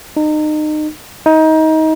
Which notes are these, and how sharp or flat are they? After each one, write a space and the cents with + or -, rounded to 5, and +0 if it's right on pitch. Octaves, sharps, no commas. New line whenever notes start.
D#4 -30
D#4 +25